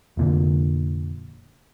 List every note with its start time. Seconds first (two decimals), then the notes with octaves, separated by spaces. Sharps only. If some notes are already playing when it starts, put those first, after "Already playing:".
0.17 F1 A#2 D3